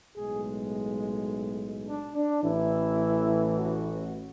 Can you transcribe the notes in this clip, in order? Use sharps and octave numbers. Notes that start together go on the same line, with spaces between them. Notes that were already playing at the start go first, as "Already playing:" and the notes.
B1 A2 G#3 G#4
D4
D4
A1 A2 E3 E4
F#4